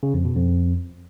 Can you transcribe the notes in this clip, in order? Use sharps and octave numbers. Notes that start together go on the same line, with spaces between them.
C#3
F2
B2
F2